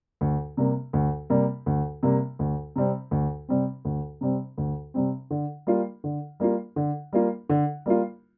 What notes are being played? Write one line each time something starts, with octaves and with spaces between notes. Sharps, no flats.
D2
C3 G3 A#3
D2
C3 G3 A#3
D2
C3 G3 A#3
D2
C3 G3 C4
D2
C3 G3 C4
D2
C3 G3 C4
D2
C3 G3 C4
D3
G3 A#3 F4
D3
G3 A#3 F4
D3
G3 A#3 F4
D3
G3 A#3 F4